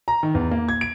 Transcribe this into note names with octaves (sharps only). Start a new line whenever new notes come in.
A#5
D#3
E2
A#3
G#6
D7